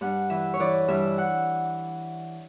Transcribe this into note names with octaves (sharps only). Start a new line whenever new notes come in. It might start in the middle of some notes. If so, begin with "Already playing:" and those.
G2 F#5
E3 E5
C#5
E3 D5
G2 E5
F#5